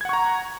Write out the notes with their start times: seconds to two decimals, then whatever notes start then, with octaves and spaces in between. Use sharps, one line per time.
0.01 G#6
0.05 F#5
0.09 C#6
0.13 A#5